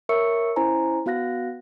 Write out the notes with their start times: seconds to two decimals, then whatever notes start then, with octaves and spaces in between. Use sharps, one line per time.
0.09 A#4 C#5 E5 C#6 E6 C#7
0.56 C#4 E4 C5 G#5 A#5
1.06 B3 F#4 F5 F#6 A#6